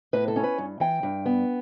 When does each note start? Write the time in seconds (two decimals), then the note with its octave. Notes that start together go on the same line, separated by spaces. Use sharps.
0.13 A2 B4
0.28 A4
0.36 C#4
0.43 B4
0.58 G2
0.80 E3 G5
1.03 G2
1.26 B3